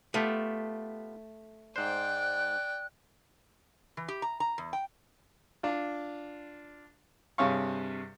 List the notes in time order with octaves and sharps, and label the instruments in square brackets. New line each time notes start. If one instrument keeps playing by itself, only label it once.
[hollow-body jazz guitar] A3 [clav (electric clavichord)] B3 F4 G4
[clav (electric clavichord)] G#2 C5 [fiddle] D5 G5 [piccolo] F#6
[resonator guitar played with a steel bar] E3
G4
A#5
A#5
E2
G5
[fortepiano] D4 F4
G2 C3 G#4 C#5 F5 C#6